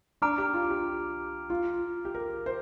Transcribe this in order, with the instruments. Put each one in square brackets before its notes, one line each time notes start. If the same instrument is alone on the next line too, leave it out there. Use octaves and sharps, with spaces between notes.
[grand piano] D4 [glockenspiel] A#5 D6 F6 D7
[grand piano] G4
F4
G4
F4
G4
A#4
C5